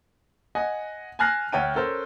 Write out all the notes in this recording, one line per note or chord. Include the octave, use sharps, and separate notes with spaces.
D#5 F#5 G#5
G#5 A5 F6 F#6 A#6 C7
D2 C#5 F#5 G5 A5 D#7
C#4 A4 A#4 C5